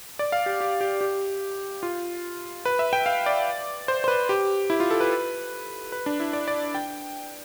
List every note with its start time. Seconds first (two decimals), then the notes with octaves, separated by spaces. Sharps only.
0.19 D5
0.32 F5
0.46 G4
0.61 G4
0.81 G4
1.01 G4
1.83 F4
2.65 B4
2.79 E5
2.93 G5
3.06 F5
3.26 D5
3.88 C5
4.04 C5
4.08 B4
4.29 G4
4.70 E4
4.80 F4
4.91 A4
5.00 B4
5.92 B4
6.06 D4
6.20 E4
6.33 D5
6.48 D5
6.75 G5